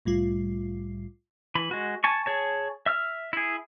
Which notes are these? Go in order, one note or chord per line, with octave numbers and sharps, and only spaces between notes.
C2 A2 G3 F4
E3 B5
G#3 F#4
G#5 A5 C#6
G#4 C#5 A5
E5 E6 F6
E4 G#4